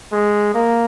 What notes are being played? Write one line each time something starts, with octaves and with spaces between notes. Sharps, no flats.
G#3
A#3